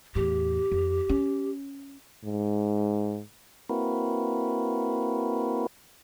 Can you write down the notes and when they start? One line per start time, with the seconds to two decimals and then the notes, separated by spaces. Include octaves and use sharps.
0.15 E2 A2 G4
0.72 F2
1.09 C#4
2.24 G#2
3.69 A#3 C4 E4 F#4 A#4 B4